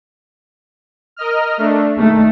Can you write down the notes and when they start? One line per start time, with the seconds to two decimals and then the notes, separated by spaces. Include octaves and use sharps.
1.16 A#4 D#5 F6
1.58 A3 D4
1.98 D#3 A3